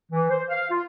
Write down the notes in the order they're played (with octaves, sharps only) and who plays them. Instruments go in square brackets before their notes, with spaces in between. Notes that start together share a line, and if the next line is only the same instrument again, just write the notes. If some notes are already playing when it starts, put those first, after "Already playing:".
[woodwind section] E3
C5
F5
F4